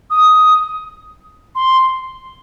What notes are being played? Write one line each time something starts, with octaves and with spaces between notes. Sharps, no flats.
D#6
C6